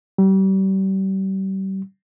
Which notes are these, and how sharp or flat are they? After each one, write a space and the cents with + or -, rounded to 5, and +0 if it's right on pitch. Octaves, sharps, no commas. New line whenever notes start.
G3 -35